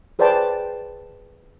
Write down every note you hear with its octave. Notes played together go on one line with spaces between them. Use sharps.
G#4 B4 C5 D5 G5 A5